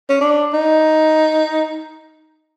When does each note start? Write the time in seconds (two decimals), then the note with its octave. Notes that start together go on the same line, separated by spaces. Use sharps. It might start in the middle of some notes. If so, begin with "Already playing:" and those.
0.10 C#4
0.21 D4
0.53 D#4